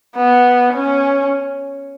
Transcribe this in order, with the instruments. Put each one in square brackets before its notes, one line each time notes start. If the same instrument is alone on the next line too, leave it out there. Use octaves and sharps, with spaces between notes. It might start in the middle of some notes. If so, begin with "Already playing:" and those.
[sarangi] B3
C#4